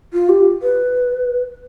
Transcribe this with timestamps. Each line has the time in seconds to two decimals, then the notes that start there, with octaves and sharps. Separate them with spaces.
0.13 F4
0.29 G4
0.62 B4